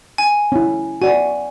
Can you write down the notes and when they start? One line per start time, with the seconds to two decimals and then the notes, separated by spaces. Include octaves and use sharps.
0.18 G#5
0.52 C#4 E4
1.02 F#4 D5 G#5